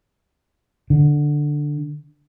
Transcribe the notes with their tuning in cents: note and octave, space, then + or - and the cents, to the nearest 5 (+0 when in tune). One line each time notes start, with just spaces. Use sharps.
D3 +5